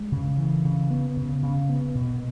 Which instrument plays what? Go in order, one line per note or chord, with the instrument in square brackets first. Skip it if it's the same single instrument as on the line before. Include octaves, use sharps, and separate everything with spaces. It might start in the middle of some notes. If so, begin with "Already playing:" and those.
Already playing: [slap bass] G#3
C#3
E3
C#3
B3
C#3
C#3
B3
B2